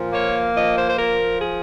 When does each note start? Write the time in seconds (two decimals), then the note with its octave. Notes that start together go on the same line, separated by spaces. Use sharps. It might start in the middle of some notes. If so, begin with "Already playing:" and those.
Already playing: A#2 F3
0.13 A#3 C#5
0.56 F3 D#5
0.77 C5
0.88 C5
0.97 F3 A#4
1.40 G#4